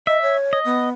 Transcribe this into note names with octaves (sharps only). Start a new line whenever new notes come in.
D#5 E5
C#5
D#5
B3